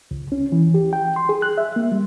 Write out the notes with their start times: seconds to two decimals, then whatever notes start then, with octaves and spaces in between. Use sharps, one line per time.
0.11 C#2
0.32 C#4
0.52 E3
0.74 G4
0.93 G5
1.16 C6
1.29 G#4
1.42 F#6
1.58 E5
1.76 A#3
1.92 G3